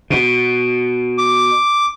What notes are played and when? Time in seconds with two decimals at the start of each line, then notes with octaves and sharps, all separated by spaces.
0.10 B2
1.18 D6